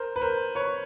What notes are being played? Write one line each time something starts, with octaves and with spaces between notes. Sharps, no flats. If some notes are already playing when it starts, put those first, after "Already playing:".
Already playing: A#4 C5
B4
A#4 C5
B4 C#5